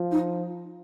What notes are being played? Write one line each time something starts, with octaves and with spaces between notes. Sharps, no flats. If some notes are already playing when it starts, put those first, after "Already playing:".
Already playing: F3
D#4